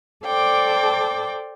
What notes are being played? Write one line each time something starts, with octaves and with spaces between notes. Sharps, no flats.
A4 C5 D5 G5 D6